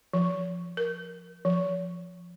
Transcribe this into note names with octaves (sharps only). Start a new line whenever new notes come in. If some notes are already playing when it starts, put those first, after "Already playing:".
F3
A#4
F3